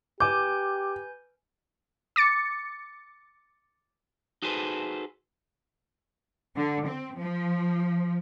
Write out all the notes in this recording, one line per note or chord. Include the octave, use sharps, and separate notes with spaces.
G4 B4 G#5 D6 G6
D6 A6 C#7
D#4 F#4 G#4 A4 B4 C5
D3
C4
F3